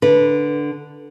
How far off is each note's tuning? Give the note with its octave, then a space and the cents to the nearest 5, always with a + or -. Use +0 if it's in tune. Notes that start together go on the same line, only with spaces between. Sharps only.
D3 +0 B4 -15